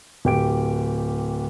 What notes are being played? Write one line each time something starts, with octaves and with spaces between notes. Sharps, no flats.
D1 G4 D7